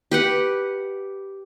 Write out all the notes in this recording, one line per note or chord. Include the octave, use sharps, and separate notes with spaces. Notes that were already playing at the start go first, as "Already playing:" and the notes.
G4 B4 F#5